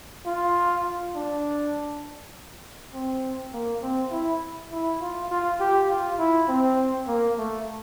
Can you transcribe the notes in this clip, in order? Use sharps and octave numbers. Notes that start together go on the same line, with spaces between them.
F4
D4
C4
A#3
C4
E4
E4
F4
F4
G4
F4
E4
C4
A#3
A3